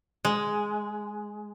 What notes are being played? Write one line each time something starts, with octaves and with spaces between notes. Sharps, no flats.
G#3